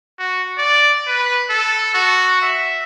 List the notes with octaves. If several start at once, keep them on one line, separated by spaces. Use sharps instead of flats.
F#4
D5
B4
A4
F#4
E5